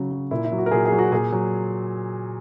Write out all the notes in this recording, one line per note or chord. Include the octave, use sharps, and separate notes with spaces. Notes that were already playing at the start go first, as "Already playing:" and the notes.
Already playing: C#3 F#3
F#3
A#2 E4
E4
F#3
F#4
A#4
A#2 G#4
G#4
F#3
F#4
A#2 G#4
F#3